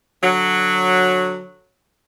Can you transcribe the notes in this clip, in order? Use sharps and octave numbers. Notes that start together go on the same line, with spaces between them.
D3 F#3